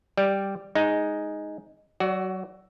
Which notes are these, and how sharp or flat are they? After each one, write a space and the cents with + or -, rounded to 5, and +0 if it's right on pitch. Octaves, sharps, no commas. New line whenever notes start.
G3 +0 D5 +0
G#3 +0 D#4 +0
F#3 +30 F#4 +10 D5 +0